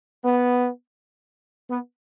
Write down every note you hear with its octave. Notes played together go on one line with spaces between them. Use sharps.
B3
B3